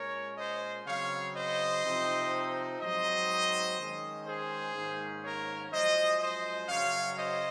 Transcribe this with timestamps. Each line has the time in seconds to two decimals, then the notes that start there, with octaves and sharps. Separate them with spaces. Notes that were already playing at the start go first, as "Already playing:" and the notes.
Already playing: A#2 G#3 C#4 A#4 C#5
0.37 C5 D#5
0.86 C#3 F#3 C4 C#5 F5
1.34 C5 D#5
1.83 C3 F3 C4 D#4
2.80 G#2 F#3 C4 D#4 C5 D#5
3.78 D#3 G#3 C#4
4.25 G#4 C5
4.75 G#2 D#3 A#3 C#4
5.23 A#4 C#5
5.71 F#2 F3 G#3 C5 D#5
6.20 C5 D#5
6.69 F#2 C#3 F#3 C#4 C#5 F5
7.17 C5 D#5